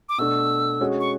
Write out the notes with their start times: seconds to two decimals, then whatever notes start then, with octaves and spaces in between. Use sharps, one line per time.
0.09 D6
0.18 B2 A3 D4 E6
0.81 G#3 C#4 F#4
1.00 C#6